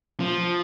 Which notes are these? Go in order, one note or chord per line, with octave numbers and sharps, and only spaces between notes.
F3